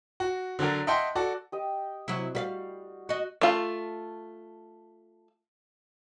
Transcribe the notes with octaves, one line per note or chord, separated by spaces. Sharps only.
F#4
D3 F#3 D4 F#4 A#4
D#5 E5 F#5 G5 A5 C6
F#4 A4 D5
G4 D#5 G5
C3 F#3 E4
G3 F#4 B4 F5
F#4 D#5
A3 F4